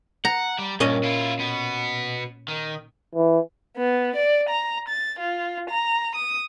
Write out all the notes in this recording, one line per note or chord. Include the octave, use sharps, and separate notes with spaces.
F#5 A#5
G3
G2 A#2 C#4 D#5
E4 F4
B2 B3
D#3
E3
B3
D5
A#5
A6
F4
A#5
D#6